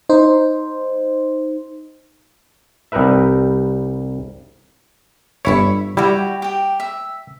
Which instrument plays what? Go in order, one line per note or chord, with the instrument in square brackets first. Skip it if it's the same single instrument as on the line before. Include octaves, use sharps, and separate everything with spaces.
[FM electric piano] D#4 C5
[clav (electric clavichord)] C2 G3 D#4 A#4 B4 E5
[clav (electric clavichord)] G1 C#5 [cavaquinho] E4 B5 C#6
[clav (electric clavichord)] G3 E4 [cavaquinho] F#4 G4 G5
[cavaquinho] G4 G5
E5